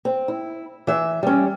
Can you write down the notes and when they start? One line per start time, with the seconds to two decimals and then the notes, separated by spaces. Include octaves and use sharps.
0.05 C4
0.28 E4
0.87 E3 E5
1.23 G3 C#4